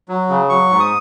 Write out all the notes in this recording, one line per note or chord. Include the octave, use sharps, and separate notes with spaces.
F#3
C#3
F#3 C#6
G#2
D#6